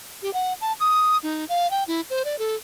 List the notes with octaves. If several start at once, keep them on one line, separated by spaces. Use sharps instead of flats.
G4
F#5
A5
D#6
D#4
F5
G5
E4
C5
D5
A4